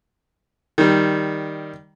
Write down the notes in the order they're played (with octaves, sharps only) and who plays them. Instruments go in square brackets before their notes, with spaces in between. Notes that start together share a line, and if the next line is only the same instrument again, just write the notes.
[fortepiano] D#3 G3